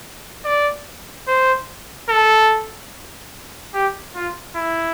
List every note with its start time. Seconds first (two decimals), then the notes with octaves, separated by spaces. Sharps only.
0.45 D5
1.28 C5
2.09 A4
3.74 G4
4.15 F4
4.56 E4